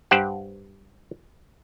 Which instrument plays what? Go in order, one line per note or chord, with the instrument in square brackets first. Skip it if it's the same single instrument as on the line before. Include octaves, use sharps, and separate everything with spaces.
[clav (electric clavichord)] G2 G4 C5 F#5